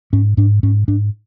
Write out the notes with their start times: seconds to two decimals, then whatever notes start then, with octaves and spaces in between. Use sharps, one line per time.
0.13 G#2 C#4
0.37 G#2 D4
0.63 G#2 C#4
0.88 G#2 D4